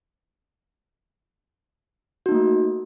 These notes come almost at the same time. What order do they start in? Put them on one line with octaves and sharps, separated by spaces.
F#4 D#4 A#3 A3